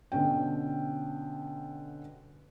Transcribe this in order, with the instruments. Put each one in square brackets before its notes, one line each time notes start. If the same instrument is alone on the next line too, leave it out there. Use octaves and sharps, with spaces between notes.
[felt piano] B2 D3 C#4 G5